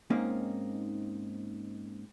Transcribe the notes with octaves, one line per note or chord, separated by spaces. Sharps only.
G#2 A#3 C4 C#4 D#4